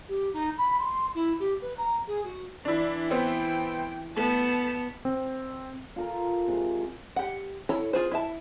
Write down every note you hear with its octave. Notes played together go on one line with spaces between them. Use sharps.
G4
D#4
B5
C6
E4
G4
B4
A#5
G#4
F#4
E3 D4 E4
B3 C4 E4 G5
A3 B3 A5
C4
F4 A4 A#4
C3 G#3
G4 F#5
E4 A4 C#5 A#5
F4 G#4 C5
E4 E5 A5